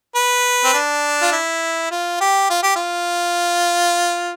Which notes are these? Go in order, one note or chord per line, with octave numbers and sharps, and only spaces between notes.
B4
C4
D4
F4
E4
F4
G4
F4
G4
F4